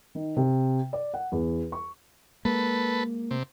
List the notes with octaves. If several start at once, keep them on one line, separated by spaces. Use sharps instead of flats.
D#3
C3
D5
F#5
E2
C#6
G#3 A#3 A4 B4
C3